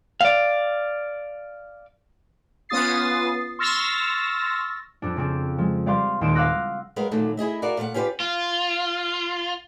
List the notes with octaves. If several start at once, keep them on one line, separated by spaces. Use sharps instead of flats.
D5 F5
B3 C#4 F4 D#6 A6 C7
C6 C#6 E6 F6 A6 A#6
F2 D4
C#3 C4 D4
F3 G#3
G3 D5 F5 C6
D#1 D#2 C6 D7 E7
F5 F#5 D6 E6 F#6 A#6
F#3 G#3 A#4 B4 F5
A#2 D3 D#3 F#3 A3
E4 G#4 D#5 E5
F#4 A#4 D5 F5 F#5
A#2 A3 F5 F#5
C#4 F4 G4 B4 D5
F4